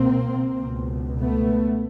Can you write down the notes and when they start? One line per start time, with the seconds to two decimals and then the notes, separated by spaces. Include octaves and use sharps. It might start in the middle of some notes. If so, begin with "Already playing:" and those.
Already playing: C#2 B2 A#3 C4
0.59 C#2 B2
1.20 A3 B3